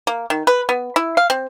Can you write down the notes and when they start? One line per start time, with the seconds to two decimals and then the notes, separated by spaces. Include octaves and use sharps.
0.07 A#3
0.30 D#3
0.47 B4
0.69 B3
0.96 E4
1.17 F5
1.30 C4